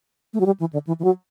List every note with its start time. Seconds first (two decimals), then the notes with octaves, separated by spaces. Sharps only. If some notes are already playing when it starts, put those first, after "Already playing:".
0.33 A3
0.40 F#3
0.46 G3
0.60 E3
0.73 D3
0.87 E3
0.99 E3
1.04 F#3